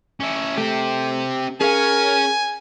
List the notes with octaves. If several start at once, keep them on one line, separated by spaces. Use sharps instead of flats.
C#4 E4
A3 C4 G4
C#4 G#4 A#4 F5 G#5